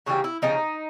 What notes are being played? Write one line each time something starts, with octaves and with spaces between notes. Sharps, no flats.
C#3 E3 G3 A#3 F#4
E4
C#3 F3 A#3 D#4